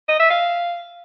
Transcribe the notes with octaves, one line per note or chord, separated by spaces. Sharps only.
D#5
E5
F5